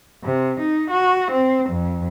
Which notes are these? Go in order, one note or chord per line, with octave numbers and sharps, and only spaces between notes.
C3
D#4
F#4
C4
F2